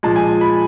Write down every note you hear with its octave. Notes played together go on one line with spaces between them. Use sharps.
A#2 F3 G#3 A5
G#5
B5